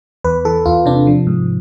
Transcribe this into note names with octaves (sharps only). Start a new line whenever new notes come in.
E2 B4
E3 A4
E2 F4
C3 D4
F3
G#2